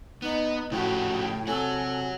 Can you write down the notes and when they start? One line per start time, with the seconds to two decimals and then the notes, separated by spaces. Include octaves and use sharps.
0.22 B3 D#4
0.72 A2 C#3 F3 F#4 G4 G5
1.47 C3 A4 C#5 F#5 G#5